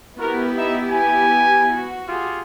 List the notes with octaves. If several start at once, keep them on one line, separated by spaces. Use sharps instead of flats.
B3 E4 F#4 G4 A#4
D#4 E5
G#5
F#4
F4 G4 G#4